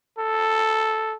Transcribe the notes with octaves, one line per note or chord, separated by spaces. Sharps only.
A4